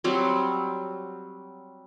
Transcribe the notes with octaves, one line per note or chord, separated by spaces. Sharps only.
F#3 G3 C4